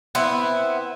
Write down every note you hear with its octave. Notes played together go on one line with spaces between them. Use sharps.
B3 C4 E4